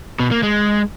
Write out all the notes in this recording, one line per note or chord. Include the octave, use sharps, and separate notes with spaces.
B2
A#3
G#3